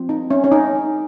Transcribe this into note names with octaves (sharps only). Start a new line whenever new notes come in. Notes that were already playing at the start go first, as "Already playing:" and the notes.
Already playing: F3 C4
D#4
C#4
C#4
D#4